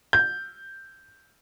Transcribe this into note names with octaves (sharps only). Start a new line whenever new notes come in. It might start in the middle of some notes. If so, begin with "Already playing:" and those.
G6